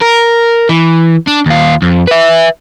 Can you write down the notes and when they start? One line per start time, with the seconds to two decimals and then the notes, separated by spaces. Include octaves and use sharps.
0.01 A#4
0.69 E3
1.27 D4
1.46 D#2 F4
1.82 F2
2.07 B4 E5